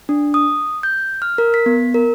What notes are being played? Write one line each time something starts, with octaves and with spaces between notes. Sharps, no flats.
D4
D#6
G6
F6
A#4
B6
B3
A#4